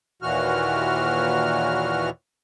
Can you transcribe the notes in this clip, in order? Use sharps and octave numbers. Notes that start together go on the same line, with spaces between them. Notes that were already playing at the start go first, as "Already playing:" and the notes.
D#2 A#2 E3 F#4 F6